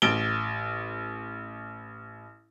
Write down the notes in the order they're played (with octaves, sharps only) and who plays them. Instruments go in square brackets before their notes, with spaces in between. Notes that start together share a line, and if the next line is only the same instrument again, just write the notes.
[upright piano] A1 D7 G7